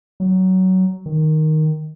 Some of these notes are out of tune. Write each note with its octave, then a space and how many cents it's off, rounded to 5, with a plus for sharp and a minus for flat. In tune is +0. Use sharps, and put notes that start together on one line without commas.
F#3 +15
D#3 +0